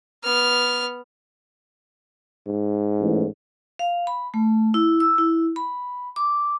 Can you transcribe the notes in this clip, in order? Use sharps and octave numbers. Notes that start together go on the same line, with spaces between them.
B3 F6
G#2
A1
F5
B5
A3
E4
E6
E4
B5
D6